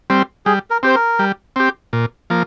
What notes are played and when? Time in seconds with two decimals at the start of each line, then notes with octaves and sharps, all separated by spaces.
0.10 G3 C4
0.46 G3 G#4
0.70 A#4
0.83 C4 G4 C5
0.95 A#4
1.19 G3
1.56 C4 G4
1.93 A#2
2.30 F3 A#3